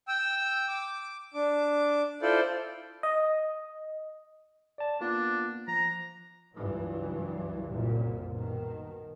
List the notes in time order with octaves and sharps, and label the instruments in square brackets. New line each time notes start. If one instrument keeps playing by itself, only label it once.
[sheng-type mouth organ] G5 E6
D6
D4 D6
E4 F4 A4 C5 D5
[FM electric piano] D#5
[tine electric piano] D5 A5
[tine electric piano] A#3 B3 F4 [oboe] D4
[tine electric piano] F3 [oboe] A#5
[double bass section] C#2 G2 E3 F#3
F#1 C2 F#2 A#2
B2 D#3